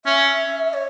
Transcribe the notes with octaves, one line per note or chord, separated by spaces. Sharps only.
C#4 E5
C#5